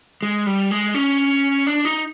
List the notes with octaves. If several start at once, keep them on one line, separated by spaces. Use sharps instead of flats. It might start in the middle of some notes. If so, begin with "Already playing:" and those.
G#3
G3
G#3
C#4
D4
D#4